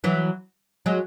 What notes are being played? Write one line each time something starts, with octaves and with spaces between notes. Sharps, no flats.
E3 F#3
F#3 G#3